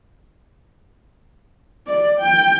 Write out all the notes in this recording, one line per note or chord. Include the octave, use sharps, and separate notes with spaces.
D5
G5